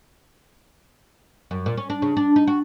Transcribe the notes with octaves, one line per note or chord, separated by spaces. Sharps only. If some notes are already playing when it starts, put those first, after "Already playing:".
F#2
A#2
C#4
D4
C#3
D4
D#4
F#4